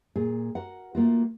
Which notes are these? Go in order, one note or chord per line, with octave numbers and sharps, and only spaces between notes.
A#2 G#4
F#4 A#4 F#5
A3 A#3 F4 F#4